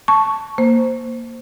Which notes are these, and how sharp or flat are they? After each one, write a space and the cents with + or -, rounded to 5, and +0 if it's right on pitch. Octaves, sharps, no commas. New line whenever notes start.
A5 +0 C#6 +5
A#3 +0 C5 +0